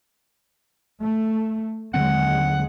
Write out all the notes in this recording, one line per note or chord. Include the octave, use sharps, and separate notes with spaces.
A3
D#2 D3 F#3 G#3 C4 F#5